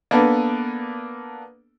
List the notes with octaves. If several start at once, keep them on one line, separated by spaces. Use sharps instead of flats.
A#3 B3 D4 A4 B4